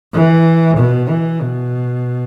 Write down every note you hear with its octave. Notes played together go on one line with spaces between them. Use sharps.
E3
B2
E3
B2